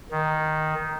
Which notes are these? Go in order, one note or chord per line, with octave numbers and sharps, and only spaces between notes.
D#3